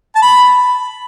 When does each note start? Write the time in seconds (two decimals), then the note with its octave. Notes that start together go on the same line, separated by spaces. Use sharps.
0.16 A5
0.22 B5